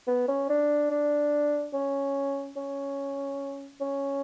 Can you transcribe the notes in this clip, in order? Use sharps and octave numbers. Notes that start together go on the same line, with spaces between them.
B3
C#4
D4
D4
C#4
C#4
C#4